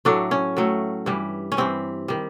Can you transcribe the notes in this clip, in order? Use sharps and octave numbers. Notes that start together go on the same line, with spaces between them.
A2 F#3 A3 D4
C#4
A2 F#3 A3
G2 E3 G3
C#4
G2 E3 G3 C4
D#3 G3